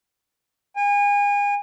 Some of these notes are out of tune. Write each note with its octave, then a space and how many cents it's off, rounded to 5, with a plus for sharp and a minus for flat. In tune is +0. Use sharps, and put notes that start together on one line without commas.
G#5 -35